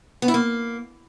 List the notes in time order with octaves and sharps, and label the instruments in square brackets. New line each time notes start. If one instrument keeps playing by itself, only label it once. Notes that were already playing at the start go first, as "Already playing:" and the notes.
[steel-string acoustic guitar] B3
E4
A#3